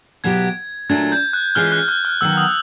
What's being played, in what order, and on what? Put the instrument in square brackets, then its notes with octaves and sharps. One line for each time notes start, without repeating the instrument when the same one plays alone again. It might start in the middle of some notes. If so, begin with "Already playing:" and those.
[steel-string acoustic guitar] B2 F#3 B3 E4 G4 [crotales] G#6
[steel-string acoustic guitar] A#2 F#3 A3 D4 [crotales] G#6
[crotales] G6
F#6
[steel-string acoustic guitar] E3 G#3 C#4 F4 [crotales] F6
[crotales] F#6
F#6
F6
[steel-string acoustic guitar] D#3 F#3 B3 [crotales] E6
[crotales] D#6